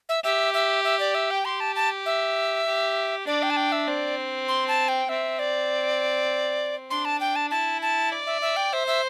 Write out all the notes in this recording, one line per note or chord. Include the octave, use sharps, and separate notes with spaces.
E5
G4 E5
E5
E5
D5
E5
G5
G4 C6
A5
A5
E5
G4
D4 D5
G5
A5
G5
E5
C4 D5
C6
A5
G5
C4 E5
D5
D4 C6
A5
G5
A5
E4 A5
A5
D5
E5
E5
G5
C5 E5
E5